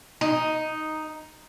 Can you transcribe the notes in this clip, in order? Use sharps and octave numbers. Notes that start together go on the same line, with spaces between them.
D#4